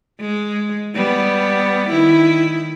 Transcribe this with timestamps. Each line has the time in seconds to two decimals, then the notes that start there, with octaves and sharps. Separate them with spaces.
0.21 G#3
0.95 G3 B3
1.90 D#3 E4